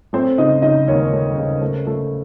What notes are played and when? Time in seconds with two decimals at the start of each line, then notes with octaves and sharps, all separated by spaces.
0.13 A3 C4 C5
0.38 C#3 D#4 D#5
0.62 C#3 D#4 D#5
0.88 D#2 C#4 C#5
1.12 A3
1.37 C#3
1.61 A3
1.87 A3